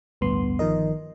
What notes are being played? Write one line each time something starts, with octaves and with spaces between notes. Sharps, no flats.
A1 D2 G2 B3 C6
G1 D#3 F3 A#4 D#5